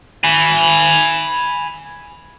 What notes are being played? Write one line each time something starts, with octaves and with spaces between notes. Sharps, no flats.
G#5 B5